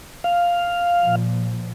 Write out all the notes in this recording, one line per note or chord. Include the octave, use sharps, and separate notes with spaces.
F5
A#2 F3